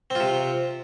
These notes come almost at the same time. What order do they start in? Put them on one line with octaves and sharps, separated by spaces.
C4 F4 C3